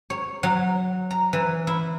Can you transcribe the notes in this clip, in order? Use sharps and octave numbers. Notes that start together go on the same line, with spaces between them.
C#5
F#3
A#5
E3
E4